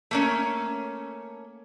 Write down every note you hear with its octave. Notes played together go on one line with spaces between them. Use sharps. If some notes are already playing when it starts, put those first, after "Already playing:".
A3 A#3 C#4